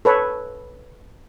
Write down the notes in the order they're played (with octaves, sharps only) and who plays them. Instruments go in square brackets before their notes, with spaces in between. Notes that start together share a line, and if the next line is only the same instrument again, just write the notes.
[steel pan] A4 B4 C#5